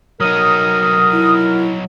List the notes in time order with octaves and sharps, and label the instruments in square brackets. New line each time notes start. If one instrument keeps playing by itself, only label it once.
[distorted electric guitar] F#3 D#4 [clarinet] A#4 [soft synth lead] D#6
[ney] E4